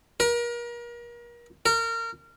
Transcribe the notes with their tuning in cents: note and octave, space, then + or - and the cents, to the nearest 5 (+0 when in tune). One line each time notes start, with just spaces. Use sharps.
A#4 +35
A#4 -25